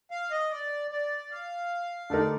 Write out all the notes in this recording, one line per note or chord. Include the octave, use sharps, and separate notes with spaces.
F5
D#5
D5
D5
F5
D3 A3 D#4 A#4 D5